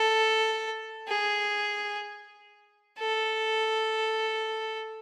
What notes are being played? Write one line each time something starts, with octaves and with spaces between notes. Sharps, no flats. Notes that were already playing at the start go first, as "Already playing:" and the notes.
Already playing: A4
G#4
A4